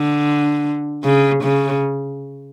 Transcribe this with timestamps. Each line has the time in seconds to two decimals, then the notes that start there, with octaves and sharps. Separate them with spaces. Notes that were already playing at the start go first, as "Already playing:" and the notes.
Already playing: D3
1.04 C#3
1.44 C#3